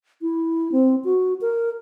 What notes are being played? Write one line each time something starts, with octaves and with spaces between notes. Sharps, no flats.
E4
C4
F#4
A#4